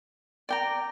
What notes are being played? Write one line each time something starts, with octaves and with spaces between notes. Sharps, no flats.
D5 G5 A#5